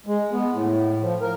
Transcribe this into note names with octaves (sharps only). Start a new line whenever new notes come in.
G#3
B3
A2
F3
A#4